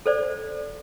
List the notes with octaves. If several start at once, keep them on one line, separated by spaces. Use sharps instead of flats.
A4 C5 D5